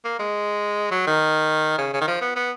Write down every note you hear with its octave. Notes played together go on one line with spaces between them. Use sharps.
A#3
G#3
F#3
D#3
C#3
C#3
D#3
F3
B3
B3